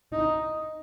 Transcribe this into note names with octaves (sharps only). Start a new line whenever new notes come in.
D#4